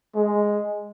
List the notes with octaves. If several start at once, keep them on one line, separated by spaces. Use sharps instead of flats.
G#3